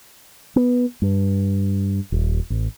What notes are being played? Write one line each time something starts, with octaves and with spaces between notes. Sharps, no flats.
B3
G2
D#1
A1